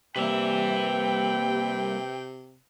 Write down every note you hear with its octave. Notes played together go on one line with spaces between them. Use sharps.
C3 G3 A#3 B4 E5 G5